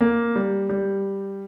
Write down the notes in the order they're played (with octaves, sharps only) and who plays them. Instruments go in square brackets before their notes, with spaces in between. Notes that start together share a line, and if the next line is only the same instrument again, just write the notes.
[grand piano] A#3
G3
G3